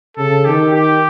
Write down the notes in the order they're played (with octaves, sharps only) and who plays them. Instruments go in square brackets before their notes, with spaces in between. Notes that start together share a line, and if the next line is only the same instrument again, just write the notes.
[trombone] C#3 [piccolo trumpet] A4
[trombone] D#3 [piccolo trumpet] G4
[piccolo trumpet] G4